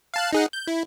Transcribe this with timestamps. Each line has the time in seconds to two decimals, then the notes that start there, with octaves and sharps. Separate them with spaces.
0.14 F5 A5 F#6
0.33 D#4 G#4 F#5
0.53 G6
0.67 E4